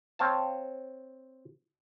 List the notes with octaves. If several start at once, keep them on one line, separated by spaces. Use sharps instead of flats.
C4 C#5 F5 A5